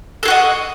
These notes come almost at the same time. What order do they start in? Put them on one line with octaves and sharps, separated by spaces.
A4 G#4 F#4 D#5